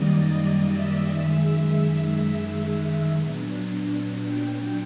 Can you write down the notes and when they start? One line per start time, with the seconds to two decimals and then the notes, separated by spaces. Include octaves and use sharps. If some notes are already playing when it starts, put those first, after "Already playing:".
Already playing: F#2 D#3 G3 A#3 D5 D#5
0.65 E5
1.16 F#2 D#3 G#3
1.67 E5
3.18 A#2 F#3 B3 D4
4.18 G5